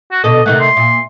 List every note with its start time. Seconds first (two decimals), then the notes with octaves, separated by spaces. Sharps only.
0.12 F#4
0.24 B2 D3 A4 D#5
0.46 C3 D#3 A3 F#5
0.60 C6
0.77 A#2